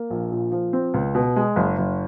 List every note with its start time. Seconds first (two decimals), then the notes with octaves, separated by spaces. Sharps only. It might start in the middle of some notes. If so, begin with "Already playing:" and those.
Already playing: A#3
0.10 A#1
0.31 A#2
0.52 F3
0.73 C4
0.94 C#2
1.15 B2
1.36 G#3
1.56 F#1
1.78 F#1